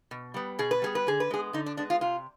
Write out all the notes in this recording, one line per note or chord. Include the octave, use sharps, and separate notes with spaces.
B2
G3 B3
B2 G#4
B4
G3 B3 G#4
B4
D3 G#4
B4
G#3 B3 G#4
D3 D#4
D4
G#3 B3 D4
F4
C3 F4